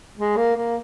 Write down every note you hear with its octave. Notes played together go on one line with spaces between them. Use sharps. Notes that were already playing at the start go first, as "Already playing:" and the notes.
G#3
A#3
A#3